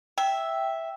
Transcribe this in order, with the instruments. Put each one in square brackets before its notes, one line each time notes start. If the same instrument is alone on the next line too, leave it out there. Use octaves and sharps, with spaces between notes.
[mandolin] E5 [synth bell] G5